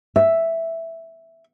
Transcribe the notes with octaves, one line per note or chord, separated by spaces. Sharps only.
E5